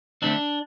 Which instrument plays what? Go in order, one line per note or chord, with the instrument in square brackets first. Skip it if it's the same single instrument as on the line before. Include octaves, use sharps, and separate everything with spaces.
[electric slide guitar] D3 A3 C4 D4